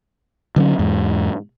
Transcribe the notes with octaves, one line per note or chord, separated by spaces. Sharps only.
D3 F#3 C#4
E2 G#2